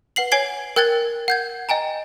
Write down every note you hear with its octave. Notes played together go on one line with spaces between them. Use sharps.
B4 F#5 C7 F#7
C#5 G#5 G#6 C7 G7
A#4 G5 F#6 G#6 A6 G7
F#5 G6 G#6
D#5 G5 G#5 A#5